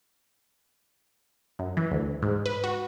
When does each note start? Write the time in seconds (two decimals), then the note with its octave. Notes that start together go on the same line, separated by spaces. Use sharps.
1.59 F#2
1.77 E3
1.91 D2
2.22 G#2
2.46 B4
2.64 F#4